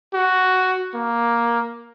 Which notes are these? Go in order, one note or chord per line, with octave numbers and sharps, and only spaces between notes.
F#4
A#3